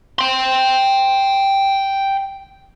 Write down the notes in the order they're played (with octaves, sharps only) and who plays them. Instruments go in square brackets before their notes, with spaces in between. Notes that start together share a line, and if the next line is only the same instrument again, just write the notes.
[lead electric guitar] G5 C6